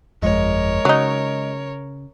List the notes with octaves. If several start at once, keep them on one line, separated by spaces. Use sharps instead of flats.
G1 F2 G#3 A#4 C#5
C#3 F#3 D#4